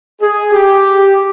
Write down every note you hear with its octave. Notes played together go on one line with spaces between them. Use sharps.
G#4
G4